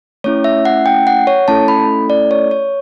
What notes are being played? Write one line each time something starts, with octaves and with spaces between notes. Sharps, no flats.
A3 C#4 E4 C#5
E5
F#5
G5
F#5
C#5
A3 C#4 E4 A4 A5
B5
D5
C#5
C#5